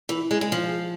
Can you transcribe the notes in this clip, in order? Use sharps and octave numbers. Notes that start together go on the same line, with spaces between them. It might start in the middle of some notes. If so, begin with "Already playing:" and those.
E3
G#3
G#3
F3